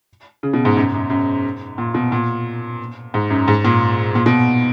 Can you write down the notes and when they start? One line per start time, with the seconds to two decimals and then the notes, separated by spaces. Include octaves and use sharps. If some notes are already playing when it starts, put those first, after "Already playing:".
0.43 C#3
0.53 B2
0.65 G#2
0.77 F#2
0.94 F#2
1.10 F#2
1.78 A#2
1.94 B2
2.12 A#2
3.14 G#2
3.30 F#2
3.48 G#2
3.64 A#2
4.15 A#2
4.26 B2